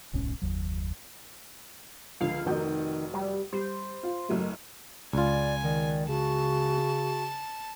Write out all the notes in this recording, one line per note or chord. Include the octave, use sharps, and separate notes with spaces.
D1 B1 G#2 C#4
F#1 D#2 F#3
C#2 D3 F3 F5
F1 D#3 F#4 G6
G3
G3 C5
F4
F#1 F#3 A3
C#2 F4 D5 G#5
D#3 D5
C#3 F#4 A5